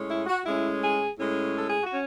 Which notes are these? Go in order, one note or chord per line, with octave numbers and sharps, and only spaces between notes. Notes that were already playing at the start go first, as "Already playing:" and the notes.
Already playing: A2 G#3 C#4
E4
F#4
A2 G#3 C#4 E4
G#4
A2 G#3 C#4
A4
G#4
F#4
C#4